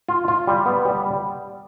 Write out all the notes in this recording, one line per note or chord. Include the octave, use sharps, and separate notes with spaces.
F4
F4
G3
B3
G3